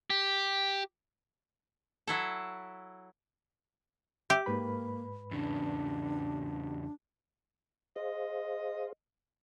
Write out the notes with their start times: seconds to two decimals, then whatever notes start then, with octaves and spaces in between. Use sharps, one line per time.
0.10 G4
2.07 F#3 E4 A4
4.30 G4 E5
4.46 G#2 A#3 B4 B5
5.31 E2 C#3 D4
7.96 G#4 C5 D#5 F5